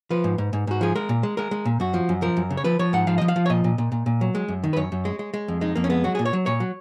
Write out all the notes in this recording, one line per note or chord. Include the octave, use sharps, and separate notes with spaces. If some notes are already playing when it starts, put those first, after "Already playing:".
F3 B4
G#2
G#2
G#2
G#2 F#4
F3 G#4
G#3 A#4
A#2
G#3
G#3 A#4
G#3
A#2
F#2 F#4
F3
F#2
F3 A#4
F#2
C#3
C#5
F3 B4
F3 C#5
G#2 F#5
F3 F5
F3 D#5
F5
F3
C#5
A#2 D#5
A#2
A#2
A#2
A#2
F#3
G#3
F#2
D#3
B4
F#2 C#5
F#2
G#3
G#3
G#3
F2
G#3 D#4
F2 A#3
C#4
G#3 B3
F#3 F#4
A#2 G#4
C#5
F#3
A#2 C#5
F#3